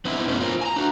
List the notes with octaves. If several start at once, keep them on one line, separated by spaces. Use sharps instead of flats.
B3 C4 D#4 E4
F#2 F#3 A3 B3 C#4
F4 A#4 C5
G#5 A#5
D4 F#4